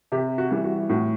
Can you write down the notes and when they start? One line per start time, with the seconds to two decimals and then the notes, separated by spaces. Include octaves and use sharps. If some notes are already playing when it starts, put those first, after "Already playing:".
0.12 C3 G4
0.38 F#4
0.51 E3 G3
0.64 F#4
0.89 A2 F#4